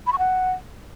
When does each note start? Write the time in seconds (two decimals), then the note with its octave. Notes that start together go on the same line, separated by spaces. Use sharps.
0.07 B5
0.13 C#6
0.19 F#5